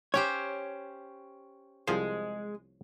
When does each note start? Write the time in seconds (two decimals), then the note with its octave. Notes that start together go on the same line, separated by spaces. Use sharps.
0.14 C#4 G4 C5 C#5
1.88 C2 F3 G#3 C5